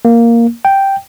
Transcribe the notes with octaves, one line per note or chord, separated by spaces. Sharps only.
A#3
G5